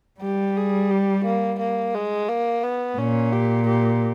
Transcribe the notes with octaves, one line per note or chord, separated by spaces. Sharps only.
G3 G4
G#4
G4
A#3
A#3
G#3
A#3
B3
A#2 C#4
G4
G4